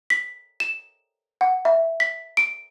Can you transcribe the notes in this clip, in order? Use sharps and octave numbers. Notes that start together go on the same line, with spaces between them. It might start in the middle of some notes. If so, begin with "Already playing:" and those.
B6
E7
F#5
E5
B6
D7